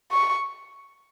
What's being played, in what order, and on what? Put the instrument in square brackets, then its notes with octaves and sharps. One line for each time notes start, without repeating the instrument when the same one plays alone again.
[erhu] C#6